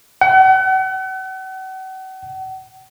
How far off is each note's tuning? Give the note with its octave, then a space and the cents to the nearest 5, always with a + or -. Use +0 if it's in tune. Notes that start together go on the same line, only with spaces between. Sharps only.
F#5 +40